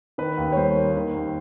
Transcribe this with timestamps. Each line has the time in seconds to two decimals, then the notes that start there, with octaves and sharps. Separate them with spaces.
0.18 D#3 B4
0.38 D#2
0.52 C#5
0.56 G3 C5
0.76 A#3
0.95 D#3
1.14 D#2